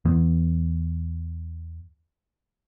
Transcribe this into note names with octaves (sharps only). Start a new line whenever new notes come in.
E2 E3 B3